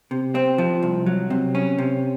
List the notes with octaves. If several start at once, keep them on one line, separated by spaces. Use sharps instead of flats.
C3
C4
F3
C2
F#3
C3
C#4
C3